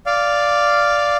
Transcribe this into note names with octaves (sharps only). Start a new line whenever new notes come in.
D5 F5